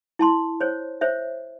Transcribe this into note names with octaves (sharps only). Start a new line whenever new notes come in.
E4 A5 C6
C5 C#5
C5 C#5 E5